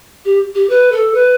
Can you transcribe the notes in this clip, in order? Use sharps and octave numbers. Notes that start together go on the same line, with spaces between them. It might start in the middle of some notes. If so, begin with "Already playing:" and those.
G4
G4
B4
A4
B4